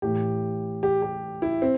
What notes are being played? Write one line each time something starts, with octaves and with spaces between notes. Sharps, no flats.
A2 E3 G4
G4
G4
E4
C4